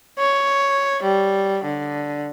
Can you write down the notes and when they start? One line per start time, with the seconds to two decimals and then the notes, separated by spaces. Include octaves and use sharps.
0.19 C#5
1.03 G3
1.64 D3